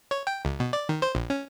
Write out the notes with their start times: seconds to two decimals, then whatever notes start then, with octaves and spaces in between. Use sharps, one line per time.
0.11 C#5
0.27 G5
0.45 C#2
0.60 B2
0.73 D5
0.89 D#3
1.02 C5
1.15 A#1
1.30 C#4